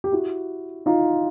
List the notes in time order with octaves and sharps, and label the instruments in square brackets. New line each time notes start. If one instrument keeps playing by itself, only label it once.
[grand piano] G4
E4 F#4
D#4 F4